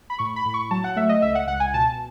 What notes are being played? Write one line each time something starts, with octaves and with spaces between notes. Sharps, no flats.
B5
A2 C#6
B5
A2
C#6
F#3 A5
F#5
A3 E5
D#5
C#2 E5
F#5
C#2 F#5
G#5
B2 A5